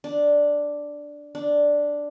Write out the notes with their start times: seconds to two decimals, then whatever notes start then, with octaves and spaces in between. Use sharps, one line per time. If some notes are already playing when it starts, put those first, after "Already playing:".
0.04 D4
1.35 D4